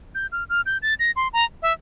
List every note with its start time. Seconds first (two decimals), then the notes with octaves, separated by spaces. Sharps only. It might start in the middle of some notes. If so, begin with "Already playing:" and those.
0.15 G6
0.32 F6
0.49 F6
0.66 G6
0.82 A6
0.99 A#6
1.16 C6
1.33 A#5
1.62 E5